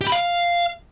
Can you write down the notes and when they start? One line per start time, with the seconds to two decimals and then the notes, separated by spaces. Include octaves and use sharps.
0.01 G4
0.07 B5
0.12 F5